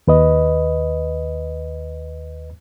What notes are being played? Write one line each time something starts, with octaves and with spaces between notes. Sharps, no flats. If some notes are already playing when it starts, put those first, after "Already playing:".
D#2 B4 D#5